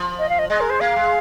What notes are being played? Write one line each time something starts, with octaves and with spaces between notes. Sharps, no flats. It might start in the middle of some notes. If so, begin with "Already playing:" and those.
Already playing: F3
D#5
F5
D#5
G#3 D#5
A#4
C5
A#3 F5
G#3